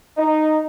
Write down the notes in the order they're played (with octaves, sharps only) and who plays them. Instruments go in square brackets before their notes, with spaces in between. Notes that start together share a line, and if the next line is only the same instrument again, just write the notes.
[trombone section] D#4